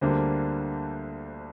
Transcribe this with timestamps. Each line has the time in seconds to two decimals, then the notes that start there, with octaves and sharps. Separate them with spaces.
0.01 D2 D3 G3 A#3 C5